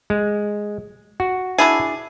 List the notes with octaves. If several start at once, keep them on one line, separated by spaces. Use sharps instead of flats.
G#3
F#4
D4 E4 G#4